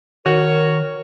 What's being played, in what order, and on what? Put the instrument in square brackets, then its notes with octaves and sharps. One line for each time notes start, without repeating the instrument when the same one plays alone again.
[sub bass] D#3 [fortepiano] F#4 [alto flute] A#4 [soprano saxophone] C#5